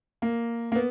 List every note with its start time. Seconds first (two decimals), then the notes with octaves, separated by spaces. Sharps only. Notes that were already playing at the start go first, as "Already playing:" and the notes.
0.22 A#3
0.72 A#3
0.75 B3